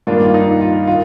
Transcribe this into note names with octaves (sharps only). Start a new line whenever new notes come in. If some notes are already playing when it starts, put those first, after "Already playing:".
G2 D#3 A#3 D4 F4
F4
D#4
F4
D#3 F4